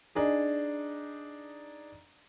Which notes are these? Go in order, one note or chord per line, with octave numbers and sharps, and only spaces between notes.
D4 D#4 G#4